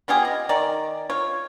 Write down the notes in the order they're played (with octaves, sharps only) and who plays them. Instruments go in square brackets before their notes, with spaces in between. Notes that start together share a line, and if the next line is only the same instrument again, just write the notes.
[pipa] B3 F4 G4 G#4
D#5
D#3 D5
F4 C#5